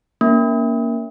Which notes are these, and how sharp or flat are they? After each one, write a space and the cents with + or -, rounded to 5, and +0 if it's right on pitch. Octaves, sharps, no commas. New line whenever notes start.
A#3 +5 C#4 +35